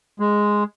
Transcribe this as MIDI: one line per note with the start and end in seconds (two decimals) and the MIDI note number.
0.20 0.64 56